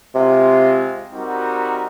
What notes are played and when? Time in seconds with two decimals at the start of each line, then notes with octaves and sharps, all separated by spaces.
0.15 C3 G#3 C4 F4
1.10 G3 C4 D#4 F#4 A#4